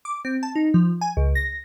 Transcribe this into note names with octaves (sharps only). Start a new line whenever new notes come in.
D6
C4
A5
D#4
F3
G#5
C#2
A#6